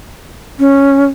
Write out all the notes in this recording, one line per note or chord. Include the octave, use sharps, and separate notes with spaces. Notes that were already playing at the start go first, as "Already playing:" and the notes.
C#4